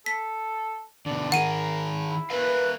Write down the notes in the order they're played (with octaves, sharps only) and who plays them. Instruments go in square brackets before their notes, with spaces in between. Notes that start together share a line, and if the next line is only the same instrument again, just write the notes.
[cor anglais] A4 [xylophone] B6
[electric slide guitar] B2 D3 [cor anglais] D5
[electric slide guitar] D#3 G#4 [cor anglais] A#4 [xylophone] F#5 D#7
[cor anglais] E4
[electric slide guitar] A#4 E5 F5 [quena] B4